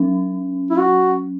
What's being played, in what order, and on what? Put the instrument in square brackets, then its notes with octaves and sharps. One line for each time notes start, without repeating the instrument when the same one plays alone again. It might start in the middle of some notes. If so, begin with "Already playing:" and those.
Already playing: [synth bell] F#3 C#4
[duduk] E4
F#4